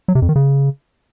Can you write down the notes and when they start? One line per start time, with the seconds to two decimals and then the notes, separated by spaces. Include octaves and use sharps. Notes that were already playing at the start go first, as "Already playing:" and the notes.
0.08 F#3
0.15 C3
0.22 F2
0.29 D#3
0.36 C#3